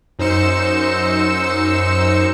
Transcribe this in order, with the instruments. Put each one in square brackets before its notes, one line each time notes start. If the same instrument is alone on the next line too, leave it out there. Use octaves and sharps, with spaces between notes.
[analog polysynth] F#2 D#4 C5 E6 C#7 E7